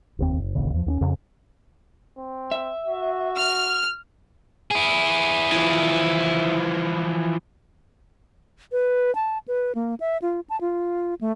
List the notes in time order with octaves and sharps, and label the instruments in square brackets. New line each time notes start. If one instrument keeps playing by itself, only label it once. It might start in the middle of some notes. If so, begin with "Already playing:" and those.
[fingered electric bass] F1 D#2 C4
F#1
D1 A1 D#2 C#3
E2 F3
D#2 C4 C#4
F2 C#3
[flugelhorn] C4
[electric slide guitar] E5
[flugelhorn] F#4
[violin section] F6
[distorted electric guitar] E4 G#4
[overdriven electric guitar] E3 F3
[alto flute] B4
A5
B4
A#3
E5
F4
A5
F4
A3